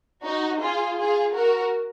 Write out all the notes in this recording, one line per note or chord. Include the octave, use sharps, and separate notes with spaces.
D#4 F#4
F4 G#4
F4 G#4
F#4 A#4